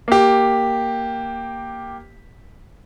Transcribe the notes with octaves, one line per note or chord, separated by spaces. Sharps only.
A#3 G4